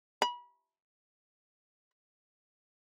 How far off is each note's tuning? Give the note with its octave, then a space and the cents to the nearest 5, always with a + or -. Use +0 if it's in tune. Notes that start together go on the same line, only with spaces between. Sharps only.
B5 -30